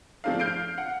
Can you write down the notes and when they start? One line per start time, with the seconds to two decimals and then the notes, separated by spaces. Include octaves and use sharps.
0.24 F3 A3 C4 D4 F5
0.40 F6 G6 C7 D7
0.78 F#5